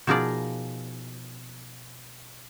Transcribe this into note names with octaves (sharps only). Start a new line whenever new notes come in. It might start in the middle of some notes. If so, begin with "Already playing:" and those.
B2 F3 D#4 G#4 A#4 D5